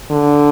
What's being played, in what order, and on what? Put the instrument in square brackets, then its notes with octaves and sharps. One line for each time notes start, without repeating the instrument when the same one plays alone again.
[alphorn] D3